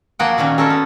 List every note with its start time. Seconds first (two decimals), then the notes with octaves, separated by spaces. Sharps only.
0.19 F3 A#3 F#4 G#4 F#5 G5
0.38 A#2 D#3 A#3 C#4
0.58 C#4 A4 A#4 C5
0.70 B3